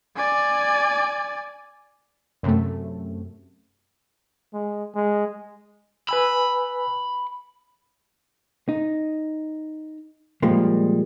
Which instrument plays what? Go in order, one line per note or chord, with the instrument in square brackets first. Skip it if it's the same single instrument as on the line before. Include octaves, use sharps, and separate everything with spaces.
[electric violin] D5 G#5
[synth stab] F#2 C3 A3
[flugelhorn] G#3
G#3
[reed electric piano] B4 G#5 E6 [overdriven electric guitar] B5
[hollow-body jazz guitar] D#4
A#2 F3 G3 G#3 A#3